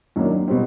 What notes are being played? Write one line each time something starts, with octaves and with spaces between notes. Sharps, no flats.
F#2 D#3 F#3 A#3 D4
B2 G3 C4